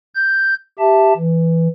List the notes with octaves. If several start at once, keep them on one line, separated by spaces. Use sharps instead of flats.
G6
G4 E5 A5
E3